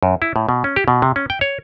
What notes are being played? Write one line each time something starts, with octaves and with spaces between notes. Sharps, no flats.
F#2
E4
A2
B2
C#4
G4
B2
C3
C#4
G5
C#5